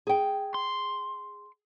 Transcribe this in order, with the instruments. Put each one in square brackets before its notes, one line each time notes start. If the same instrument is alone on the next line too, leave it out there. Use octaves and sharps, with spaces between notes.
[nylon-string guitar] G#4 G5
[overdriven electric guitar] C6